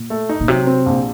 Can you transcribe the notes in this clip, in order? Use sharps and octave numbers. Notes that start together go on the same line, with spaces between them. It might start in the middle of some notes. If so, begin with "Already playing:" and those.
Already playing: A#2
A3
D#4
A#2
C3 F#3
C4
A#1